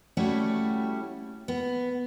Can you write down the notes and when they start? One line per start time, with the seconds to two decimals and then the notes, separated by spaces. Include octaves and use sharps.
0.17 G3 A3 C#4 E4 F#4 G4
1.48 B3